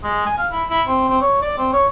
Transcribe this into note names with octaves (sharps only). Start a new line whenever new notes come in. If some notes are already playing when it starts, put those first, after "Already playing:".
G#3
G#5
F5
E4
E4
C4
C4
C#5
D5
C4
C#5